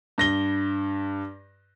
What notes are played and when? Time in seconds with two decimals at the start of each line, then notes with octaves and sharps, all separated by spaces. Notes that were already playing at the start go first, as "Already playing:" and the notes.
0.18 G2 A#6 G7